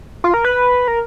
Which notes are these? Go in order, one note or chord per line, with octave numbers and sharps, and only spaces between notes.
F4
A#4
B4
A#4